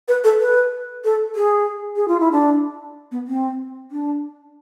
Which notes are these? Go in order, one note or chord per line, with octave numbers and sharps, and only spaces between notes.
B4
A4
B4
A4
G#4
G#4
F4
E4
D4
B3
C4
D4